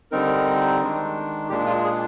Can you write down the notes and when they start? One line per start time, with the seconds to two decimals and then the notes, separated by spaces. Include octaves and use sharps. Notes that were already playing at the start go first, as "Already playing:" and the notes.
0.12 D3 G3 C4 D#4 A#4
0.81 D#3 G#3 D4
1.49 A#2 G#3 D4 G4
1.66 F4
1.85 G#4